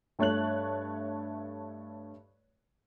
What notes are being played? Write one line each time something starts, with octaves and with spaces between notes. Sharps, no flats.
G2 A3 C#5 A5 F#6 F#7